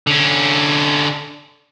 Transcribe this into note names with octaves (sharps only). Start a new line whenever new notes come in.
D3 C#4